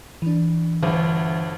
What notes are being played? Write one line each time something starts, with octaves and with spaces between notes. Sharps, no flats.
E3 D4
G1 D2 E3